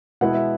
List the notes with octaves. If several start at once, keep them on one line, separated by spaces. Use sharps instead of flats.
B2 G#3 B3 E4 F#5
E5